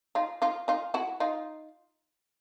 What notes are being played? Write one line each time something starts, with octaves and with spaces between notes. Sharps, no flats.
D#4 F4
D#4 F4
D#4 F4
E4 F#4
D#4 F4